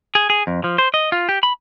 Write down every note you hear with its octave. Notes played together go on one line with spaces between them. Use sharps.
G#4
G#4
F2
F3
C5
D#5
F4
G4
B5